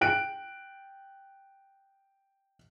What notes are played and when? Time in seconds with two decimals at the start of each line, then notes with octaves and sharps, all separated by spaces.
0.01 G5 F#6 D7